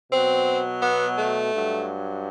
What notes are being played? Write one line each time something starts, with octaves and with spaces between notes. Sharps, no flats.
B2 F#3 C4
B3
A3
G2 F#3